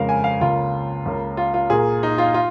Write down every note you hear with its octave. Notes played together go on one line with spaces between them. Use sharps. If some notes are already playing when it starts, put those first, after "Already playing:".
Already playing: F2 C#3 F3 G#3 A#4 F5
G#5
F5
C#2 C#3 A#3 F4
C#2 C#3 A#3
F4
F4
A#2 A#3 G#4
D#4
F4
F4